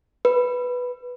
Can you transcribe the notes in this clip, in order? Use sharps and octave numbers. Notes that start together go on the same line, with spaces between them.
B4